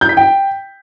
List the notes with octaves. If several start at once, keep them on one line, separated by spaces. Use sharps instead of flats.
G6
B6
G5